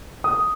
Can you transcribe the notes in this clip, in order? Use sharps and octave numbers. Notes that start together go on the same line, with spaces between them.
D#6